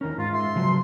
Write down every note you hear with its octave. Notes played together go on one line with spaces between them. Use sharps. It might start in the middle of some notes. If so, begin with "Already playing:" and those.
D#2 C#4 D#4 E4 A#4
G#2 F4
E5 C6
C#3 F3 F#3